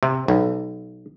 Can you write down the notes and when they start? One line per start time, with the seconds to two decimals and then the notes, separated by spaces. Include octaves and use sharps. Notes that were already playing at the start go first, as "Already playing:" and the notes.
0.03 C3
0.28 B1